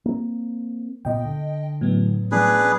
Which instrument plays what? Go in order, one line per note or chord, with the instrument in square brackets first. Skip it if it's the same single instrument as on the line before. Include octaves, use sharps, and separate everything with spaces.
[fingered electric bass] A#3 C4
[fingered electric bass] C#2 A#2 B3 [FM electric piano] D#5 G5
[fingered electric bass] D3
[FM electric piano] A2 F#3 B3
[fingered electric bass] F3 A3 C#4 [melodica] D4 G#4 B4